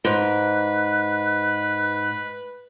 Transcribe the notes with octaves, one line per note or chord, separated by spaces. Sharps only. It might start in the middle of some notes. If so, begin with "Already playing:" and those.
G#2 B4 F#6